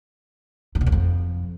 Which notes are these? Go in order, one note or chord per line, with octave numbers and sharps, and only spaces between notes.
G2
B2
E2
F2